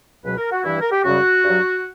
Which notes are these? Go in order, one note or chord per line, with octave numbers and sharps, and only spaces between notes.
C#2 B2 F#3 B4
A#4
F#4
G2 E3 G3 E4
A#4
G4
F#2 C#3 G3 F#4
G2 F#3